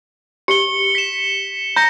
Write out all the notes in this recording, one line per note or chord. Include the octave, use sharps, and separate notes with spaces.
G4 C#7 G7
B6 E7
A#5 G6 A#6 C#7